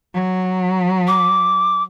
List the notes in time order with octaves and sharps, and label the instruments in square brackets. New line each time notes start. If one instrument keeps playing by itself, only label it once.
[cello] F#3
[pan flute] D6